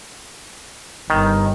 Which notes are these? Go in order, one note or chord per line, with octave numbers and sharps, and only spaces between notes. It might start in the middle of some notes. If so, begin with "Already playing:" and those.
G1 D#3